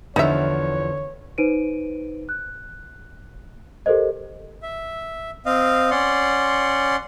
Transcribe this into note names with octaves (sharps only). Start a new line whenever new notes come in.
E2 D3 F3 B3 D#4 C#5 E5
D#4 B4 C5 D7 D#7
F#6
G4 A4 A#4 C5 D#5
E5
C4 D#5 F5
C#4 D5 F#5 C6